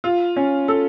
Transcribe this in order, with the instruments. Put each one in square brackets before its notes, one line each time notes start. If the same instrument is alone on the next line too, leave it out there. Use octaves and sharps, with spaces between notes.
[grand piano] F4
C#4
A4